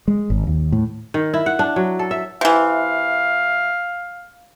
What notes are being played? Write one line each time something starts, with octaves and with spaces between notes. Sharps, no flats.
G#3
G#1
D#2
A2
D#3
E4
F#5
D4
F#3
A4
E5
C3 E3 F5